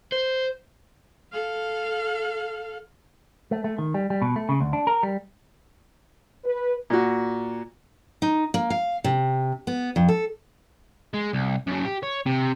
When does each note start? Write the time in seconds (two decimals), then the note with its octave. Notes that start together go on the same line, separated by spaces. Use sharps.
0.12 C5
1.32 A4 F5
3.51 A3
3.64 A3
3.78 D#3
3.94 G3
4.10 G3
4.22 B2
4.36 A3
4.49 C#3
4.61 D2
4.73 D4
4.87 A#4
5.03 G3
6.45 B4
6.90 A#2 F#4
8.22 D#4
8.54 A#3
8.70 F5
9.04 C3
9.67 B3
9.96 F2
10.08 A4
11.14 G#3
11.33 C2
11.67 F#2 C#3
11.85 G4
12.03 C#5
12.26 C3